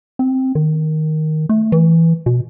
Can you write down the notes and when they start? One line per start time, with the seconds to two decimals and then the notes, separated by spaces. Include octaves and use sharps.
0.19 C4
0.55 D#3
1.49 A3
1.72 E3
2.26 B2